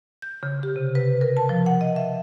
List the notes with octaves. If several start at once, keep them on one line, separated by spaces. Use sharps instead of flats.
G6
C#3
G4
C3
B4
A#4
A5
F3
F#5
D#5
E5